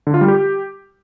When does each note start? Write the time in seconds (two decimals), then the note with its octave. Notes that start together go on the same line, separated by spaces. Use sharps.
0.07 D3
0.14 F4
0.21 G3
0.28 G4